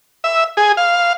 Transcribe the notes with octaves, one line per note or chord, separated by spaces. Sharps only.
E5
G#4
F5